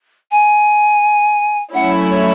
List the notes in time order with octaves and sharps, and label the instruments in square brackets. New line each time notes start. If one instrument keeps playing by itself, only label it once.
[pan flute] G#5
[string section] F#3 A3 C#4 E4 [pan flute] F#5
[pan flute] C#5